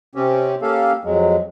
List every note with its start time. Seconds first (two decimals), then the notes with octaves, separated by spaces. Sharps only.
0.15 C3 C4 C#4 G4
0.62 A#3 C#4 G4 A4 F5
1.05 F2 F#3 G#3